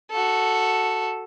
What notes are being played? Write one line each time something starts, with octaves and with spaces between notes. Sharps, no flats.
F#4 A4